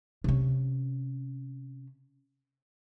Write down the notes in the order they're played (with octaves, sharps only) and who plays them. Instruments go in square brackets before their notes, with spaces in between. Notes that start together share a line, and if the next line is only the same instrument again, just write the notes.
[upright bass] C3 C#4